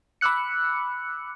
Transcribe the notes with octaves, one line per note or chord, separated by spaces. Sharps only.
B5 D6 E6 F#6 C#7